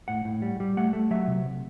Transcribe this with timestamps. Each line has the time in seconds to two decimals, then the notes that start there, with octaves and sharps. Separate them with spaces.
0.08 A2 F#5
0.25 A2
0.42 G3
0.60 G3
0.77 A3 F#5
0.93 A3
1.11 F#3 E5
1.27 C3